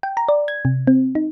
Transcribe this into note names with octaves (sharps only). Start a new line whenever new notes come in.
G5
A#5
D5
G#6
C3
C4
D#4